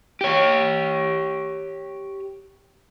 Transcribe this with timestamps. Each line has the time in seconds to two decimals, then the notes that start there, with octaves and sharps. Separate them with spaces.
0.21 G4 C#5